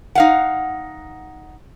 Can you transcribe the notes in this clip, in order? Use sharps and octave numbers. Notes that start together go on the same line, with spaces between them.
D#4 F5 F#5